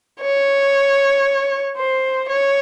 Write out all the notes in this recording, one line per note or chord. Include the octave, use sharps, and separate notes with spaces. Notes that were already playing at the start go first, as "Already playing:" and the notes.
C#5
C5
C#5